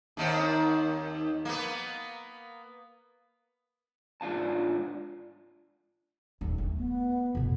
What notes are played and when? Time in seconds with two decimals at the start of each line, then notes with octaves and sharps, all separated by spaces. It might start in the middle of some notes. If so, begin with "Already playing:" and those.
0.17 D#2 D#3 C4
1.45 A#3 B3
4.21 G#2 D4 F4 F5 A5
6.41 D#1 F#2
6.58 A3
6.76 B3
7.35 F2 B2